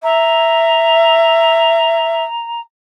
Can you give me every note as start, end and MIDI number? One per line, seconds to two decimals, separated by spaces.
0.03 2.23 76
0.03 2.60 82